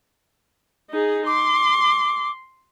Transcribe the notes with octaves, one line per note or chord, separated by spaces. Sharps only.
D#4 G#4
C6 D6